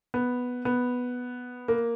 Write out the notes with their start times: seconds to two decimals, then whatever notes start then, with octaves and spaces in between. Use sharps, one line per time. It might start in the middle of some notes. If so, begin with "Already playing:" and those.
0.14 B3
0.65 B3
1.68 A#3